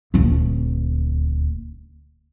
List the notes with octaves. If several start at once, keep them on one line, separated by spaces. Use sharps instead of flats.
D#1 D2